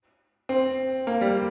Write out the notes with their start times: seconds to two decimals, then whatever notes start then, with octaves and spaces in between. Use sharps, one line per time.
0.49 C4
1.07 A#3
1.21 G3